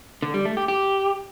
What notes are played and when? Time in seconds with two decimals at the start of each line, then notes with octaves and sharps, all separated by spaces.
0.22 D3
0.34 G3
0.45 A3
0.57 G4
0.68 G4